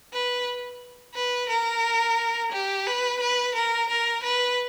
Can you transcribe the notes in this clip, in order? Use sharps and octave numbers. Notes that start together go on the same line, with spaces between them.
B4
B4
A#4
G4
B4
B4
A#4
A#4
B4